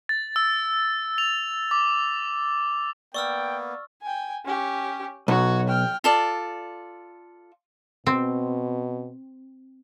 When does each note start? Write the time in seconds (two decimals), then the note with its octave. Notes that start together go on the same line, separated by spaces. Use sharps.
0.09 A6
0.36 E6
1.18 F7
1.71 D6
3.14 A#3 B3 D5 G5 C#6 E6 F6
4.02 G5 G#5
4.45 C#4 G4
5.28 B1 F#4 C#5
5.68 G5 F6
6.04 F4 A4 D5
8.06 B2 C4